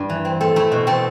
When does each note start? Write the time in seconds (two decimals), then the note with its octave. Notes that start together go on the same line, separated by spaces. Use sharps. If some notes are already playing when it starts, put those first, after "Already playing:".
Already playing: G2 G3
0.10 E3
0.25 C4
0.41 C4 A4
0.56 A3 E4
0.72 B2
0.87 C4 A4